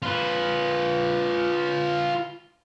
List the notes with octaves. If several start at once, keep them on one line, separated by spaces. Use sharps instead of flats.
F4 B4